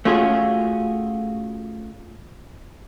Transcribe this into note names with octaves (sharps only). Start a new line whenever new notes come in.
A3 C#4 F4 F#4 G#4